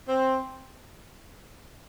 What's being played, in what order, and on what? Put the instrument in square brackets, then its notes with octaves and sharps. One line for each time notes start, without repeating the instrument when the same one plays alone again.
[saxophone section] C4